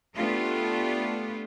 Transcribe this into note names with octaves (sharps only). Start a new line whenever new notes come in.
A3 B3 D4 F4 G4